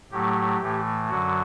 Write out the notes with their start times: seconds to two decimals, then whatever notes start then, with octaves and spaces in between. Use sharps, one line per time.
0.11 A2 F#3 A3 G4
0.61 A2 E3 A3
1.09 F#2 D3 F#3 F#4